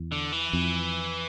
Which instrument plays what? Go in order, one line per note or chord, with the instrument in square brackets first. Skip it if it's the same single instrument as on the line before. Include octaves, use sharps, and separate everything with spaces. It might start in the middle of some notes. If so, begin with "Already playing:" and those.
Already playing: [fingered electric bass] E2
[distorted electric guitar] D3
E3
[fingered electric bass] F2